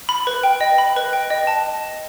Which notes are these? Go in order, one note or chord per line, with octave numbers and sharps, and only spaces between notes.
B5
B4
G5
D#5
B5
B4
G5
D#5
A5